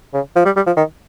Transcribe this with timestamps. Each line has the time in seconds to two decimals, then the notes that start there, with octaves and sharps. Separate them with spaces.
0.14 C#3
0.36 F3
0.46 G3
0.56 G3
0.67 F3
0.77 D#3